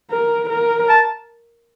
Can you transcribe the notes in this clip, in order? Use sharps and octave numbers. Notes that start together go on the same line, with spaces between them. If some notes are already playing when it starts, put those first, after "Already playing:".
A#4
A#4
A5